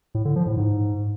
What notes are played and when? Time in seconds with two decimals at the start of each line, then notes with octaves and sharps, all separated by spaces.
0.15 A2
0.25 D3
0.36 F3
0.46 A2
0.57 G#2